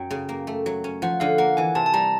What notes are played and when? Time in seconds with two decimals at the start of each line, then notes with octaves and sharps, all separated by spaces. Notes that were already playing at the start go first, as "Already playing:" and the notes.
Already playing: F#2 F#3 G5
0.11 C#3
0.29 A#3
0.47 A3
0.66 F#3
0.84 C#4
1.02 F3 F#5
1.20 D3 F5
1.38 A#3 F#5
1.57 E3 G#5
1.75 C3 A5
1.86 A5
1.94 G3 A#5